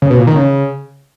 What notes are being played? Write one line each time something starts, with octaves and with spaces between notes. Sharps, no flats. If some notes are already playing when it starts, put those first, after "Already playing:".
C#3
B2
A#2
D#3
C#3